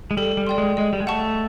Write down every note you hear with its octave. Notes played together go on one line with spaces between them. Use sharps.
G#3
G3 A4
G3
D5 G5 C6
G#3
G#3 D#5
G3
G#3
A3 F#5 A5 C#6